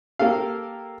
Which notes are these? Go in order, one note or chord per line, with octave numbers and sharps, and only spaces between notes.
A#3 G4 A4 F5